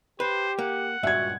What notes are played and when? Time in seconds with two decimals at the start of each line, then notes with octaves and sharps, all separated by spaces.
0.20 G4 B4 C5
0.59 A#3 F#5
1.03 C#2 G2 A#2 F#4 E5 G#6